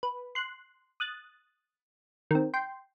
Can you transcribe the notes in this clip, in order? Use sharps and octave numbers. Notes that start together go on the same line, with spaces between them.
B4
C6 F#6
D#6 F#6 A6
D#3 C4
G5 C6